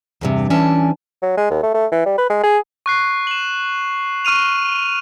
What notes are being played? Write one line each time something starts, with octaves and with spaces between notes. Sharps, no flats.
E2 G2 C3
E3 C#4 D4 G#5 A5
F#3
G#3
D#2
A3
A3
E3
G3
B4
G#3
G#4
C#6 F#6 C7
E7 F#7
C#6 F6 D#7 F7